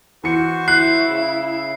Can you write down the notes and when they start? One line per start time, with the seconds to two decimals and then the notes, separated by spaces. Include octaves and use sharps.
0.24 E3 F#4 C5 C#6 C#7
0.68 E4 F#6 C7
1.07 C#3